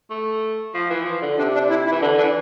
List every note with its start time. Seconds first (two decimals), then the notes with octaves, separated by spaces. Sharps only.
0.10 A3
0.74 F3
0.90 E3
1.06 F3
1.22 D3
1.38 C3 D4
1.54 D4
1.70 E4
1.86 E4
1.92 E3
2.01 D3 D4
2.17 E3 D4